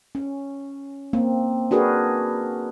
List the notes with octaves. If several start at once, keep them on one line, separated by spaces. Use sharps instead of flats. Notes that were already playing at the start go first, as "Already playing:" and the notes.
C#4
A#3 C4
D4 F#4 G#4 A#4 B4